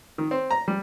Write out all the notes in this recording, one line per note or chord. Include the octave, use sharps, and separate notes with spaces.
D#3
C4
A#5
G3